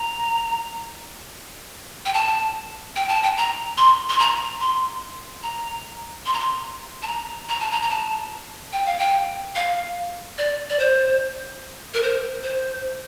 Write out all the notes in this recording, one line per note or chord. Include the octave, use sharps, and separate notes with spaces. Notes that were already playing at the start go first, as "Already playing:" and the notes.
Already playing: A#5
G5
A5
G5
A5
G5
A#5
C6
C6
A#5
C6
A#5
C6
A#5
C6
A5
A#5
A#5
A5
A#5
A#5
A5
G5
F5
G5
F5
D5
D5
C5
A#4
C5
C5